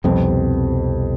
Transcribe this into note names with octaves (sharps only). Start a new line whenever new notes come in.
C2 F2 B2 G3 C4